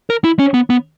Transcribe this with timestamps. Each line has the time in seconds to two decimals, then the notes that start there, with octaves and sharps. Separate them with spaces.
0.10 A#4
0.24 E4
0.39 C#4
0.54 B3
0.70 B3